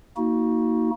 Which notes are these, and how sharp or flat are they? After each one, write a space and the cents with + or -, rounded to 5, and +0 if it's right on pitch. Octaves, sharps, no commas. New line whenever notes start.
A#3 +0 D#4 +30 F#4 +0